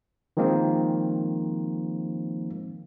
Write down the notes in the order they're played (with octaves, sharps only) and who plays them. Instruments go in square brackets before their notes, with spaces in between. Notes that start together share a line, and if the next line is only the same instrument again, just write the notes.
[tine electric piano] D#3 F3 G#3 A#3 C4